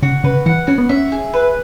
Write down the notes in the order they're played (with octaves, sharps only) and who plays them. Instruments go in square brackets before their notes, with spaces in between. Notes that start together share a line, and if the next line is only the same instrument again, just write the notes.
[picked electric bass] C#3 [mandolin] F#4
[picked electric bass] C#3 [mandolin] B4
[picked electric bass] E3 [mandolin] F#5
[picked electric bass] C#4 [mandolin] F#4
[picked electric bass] B3
[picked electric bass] C#4 [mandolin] E5
[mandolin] G#4
B4